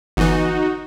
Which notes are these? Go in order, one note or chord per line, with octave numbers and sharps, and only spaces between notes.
G1 E3 D#4 F#4